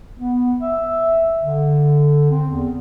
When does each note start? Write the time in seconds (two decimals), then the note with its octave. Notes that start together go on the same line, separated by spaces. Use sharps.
0.18 B3
0.61 E5
1.42 D3
2.30 C4
2.50 E2